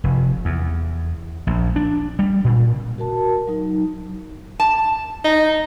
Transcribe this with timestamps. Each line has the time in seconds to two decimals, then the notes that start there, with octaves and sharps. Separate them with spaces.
0.04 F1
0.45 E2
1.47 A#1
1.76 D4
2.19 G3
2.45 A#2
2.98 F#4 A#4 A5
3.47 F#3 D#4
4.60 A5
5.25 D#4